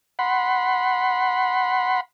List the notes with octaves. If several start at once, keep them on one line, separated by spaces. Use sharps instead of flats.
F#5 B5 C6